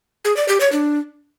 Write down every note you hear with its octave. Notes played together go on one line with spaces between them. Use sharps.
G#4
D5
G4
C#5
D4